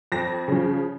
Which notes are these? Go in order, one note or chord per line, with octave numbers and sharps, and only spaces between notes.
F2 A#6
C#3 F3